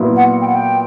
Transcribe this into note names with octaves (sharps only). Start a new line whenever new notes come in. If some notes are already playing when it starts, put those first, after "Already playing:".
Already playing: A#2 F#3 B3 E4
F#5
G5
F#5
G5